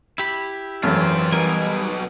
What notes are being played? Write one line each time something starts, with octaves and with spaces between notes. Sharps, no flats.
E4 G4 B5
G#1 F#2 E3 A3 C4 F4
B1 B2 G3 D#4 A#4 G#5